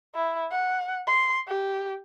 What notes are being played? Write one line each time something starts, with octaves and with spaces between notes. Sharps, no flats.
E4
F#5
C6
G4